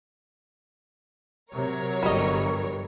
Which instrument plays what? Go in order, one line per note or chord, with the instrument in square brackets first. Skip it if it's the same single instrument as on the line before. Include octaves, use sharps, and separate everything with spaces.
[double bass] C3 [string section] F#3 A#4 C#5
[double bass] G1 [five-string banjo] G3 D#5